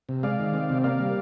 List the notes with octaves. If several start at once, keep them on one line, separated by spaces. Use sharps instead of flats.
C3
G#3 D5 F5
D#3
C4
C3
A#3 D5 F5
G3